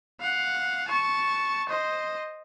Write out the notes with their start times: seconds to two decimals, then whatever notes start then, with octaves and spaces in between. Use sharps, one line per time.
0.21 F5 F#5
0.88 A5 C#6
1.69 C5 D#5